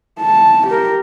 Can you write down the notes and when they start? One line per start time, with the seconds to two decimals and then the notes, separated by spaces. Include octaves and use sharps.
0.21 A5
0.67 G4 A#4